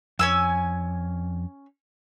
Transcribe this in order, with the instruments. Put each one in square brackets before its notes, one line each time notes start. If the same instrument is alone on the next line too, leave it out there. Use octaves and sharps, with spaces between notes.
[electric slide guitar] F2 [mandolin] C#4 G#5 E6